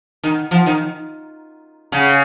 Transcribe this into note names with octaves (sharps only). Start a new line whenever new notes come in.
D#3
F3
D#3
C#3